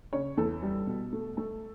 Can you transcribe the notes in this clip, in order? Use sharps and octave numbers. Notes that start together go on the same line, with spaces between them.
C#3 C#5
E2 A4
G3
B2
A3
A3 A4